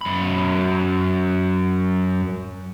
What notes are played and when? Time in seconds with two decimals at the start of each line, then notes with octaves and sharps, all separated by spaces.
0.01 F#2 B5